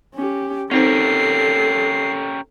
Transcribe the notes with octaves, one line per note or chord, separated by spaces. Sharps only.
C#4 G4
C4 C#4 D#4 G4 A4 A#4 C5 C7